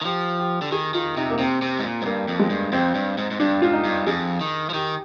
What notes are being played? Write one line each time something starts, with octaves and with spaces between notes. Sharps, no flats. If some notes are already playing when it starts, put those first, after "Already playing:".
D#3
F3 G4
G4
D3
D#3 G#4
D#3 F4
C3 D#4
A#3
C3 C4
C3
G#2
A#2
G#2
G2 A#3
F2
G#3
G2
F2 C4
G2
G#2
G#2
G2 D4
G#2 F4
D#4
G2
F2 G#4
D#3
F3
D#3 G4